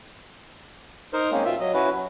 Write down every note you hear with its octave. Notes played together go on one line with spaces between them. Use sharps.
D#4 A#4 C5
G#3 A#3 C4 C#4
B2 F4 E5
F#3 D#5
C#4 E4 F#4 B4
F#3